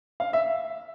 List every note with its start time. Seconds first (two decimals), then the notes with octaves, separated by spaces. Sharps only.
0.20 F5
0.33 E5